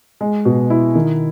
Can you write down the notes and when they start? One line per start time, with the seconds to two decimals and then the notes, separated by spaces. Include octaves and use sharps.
0.21 G#3
0.45 B2
0.70 E4
0.95 D#3